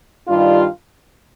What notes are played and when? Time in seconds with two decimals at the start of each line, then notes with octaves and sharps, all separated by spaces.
0.28 G2 D#3 G3 D4 F4